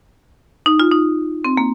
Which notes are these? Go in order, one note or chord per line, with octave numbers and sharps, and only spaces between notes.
D#4
F4
D#4
C4
A#3